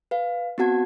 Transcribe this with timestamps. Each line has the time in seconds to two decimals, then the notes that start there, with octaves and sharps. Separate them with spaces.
0.11 B4 F5
0.58 B3 C4 F#4 F#5 A5 G#6